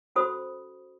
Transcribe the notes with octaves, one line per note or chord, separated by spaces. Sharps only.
C#4 F#4 A4 C5 B5 D#6